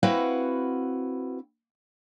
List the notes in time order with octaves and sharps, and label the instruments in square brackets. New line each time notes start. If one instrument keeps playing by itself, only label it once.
[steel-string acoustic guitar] C4 E4 F#4 B4 F5 F#5